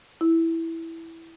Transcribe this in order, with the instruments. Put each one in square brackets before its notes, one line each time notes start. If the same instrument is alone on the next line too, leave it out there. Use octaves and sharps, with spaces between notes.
[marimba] E4